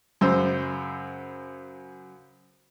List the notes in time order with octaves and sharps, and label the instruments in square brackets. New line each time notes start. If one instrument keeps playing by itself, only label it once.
[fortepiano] F#2 C#3 C5 E6